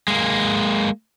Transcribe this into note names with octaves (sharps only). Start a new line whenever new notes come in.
G#3 A#3